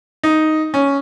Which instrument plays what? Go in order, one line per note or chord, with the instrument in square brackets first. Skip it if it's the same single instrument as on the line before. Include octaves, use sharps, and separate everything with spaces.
[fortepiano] D#4
C#4